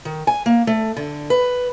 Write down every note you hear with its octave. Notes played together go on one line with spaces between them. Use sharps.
D#3
G#5
A#3
A3
D3
B4